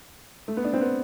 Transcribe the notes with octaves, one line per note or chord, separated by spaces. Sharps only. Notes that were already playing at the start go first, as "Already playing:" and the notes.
A3
B3
D4
C4
B3